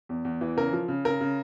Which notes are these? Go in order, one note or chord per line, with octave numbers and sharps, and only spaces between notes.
E2
E2
E3
C#3 A#4
F3
C#3
C#3 A#4
C#3